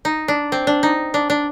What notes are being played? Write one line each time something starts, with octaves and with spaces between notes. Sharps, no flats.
D#4
D4
C4
D4
D#4
D4
D4